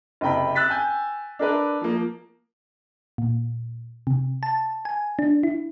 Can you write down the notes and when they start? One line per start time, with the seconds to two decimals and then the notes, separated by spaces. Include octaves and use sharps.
0.21 F#1 C3 G5 B5
0.55 E6 F#6 A6 B6
0.70 G5 G#5 G6
1.39 D4 A#4 B4
1.81 F3 A#3
3.18 A#2
4.07 C3
4.43 A5
4.85 G#5
5.19 D4
5.43 E4